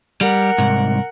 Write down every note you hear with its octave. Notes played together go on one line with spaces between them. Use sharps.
G3 A#4 F#5
C2 G#2